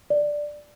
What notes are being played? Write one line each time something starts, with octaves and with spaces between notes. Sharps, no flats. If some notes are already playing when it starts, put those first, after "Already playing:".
D5